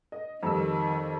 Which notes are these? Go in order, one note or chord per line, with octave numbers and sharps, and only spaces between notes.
D#5
F2 D#3 G3 E6